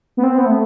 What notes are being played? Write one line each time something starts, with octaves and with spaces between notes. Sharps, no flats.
B3
C4
B3
A3